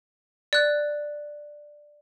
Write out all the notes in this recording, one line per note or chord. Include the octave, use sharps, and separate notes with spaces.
D5 F#6